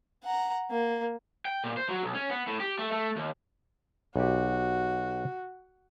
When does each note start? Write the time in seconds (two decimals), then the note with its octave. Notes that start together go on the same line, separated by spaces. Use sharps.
0.23 F#5 A#5
0.70 A#3
1.45 G5
1.64 A#2
1.77 C5
1.89 F#3
2.03 B1
2.15 C#4
2.30 B3
2.47 A2
2.60 G4
2.78 A3
2.92 A3
3.16 D#2
4.16 B1 F#4 G4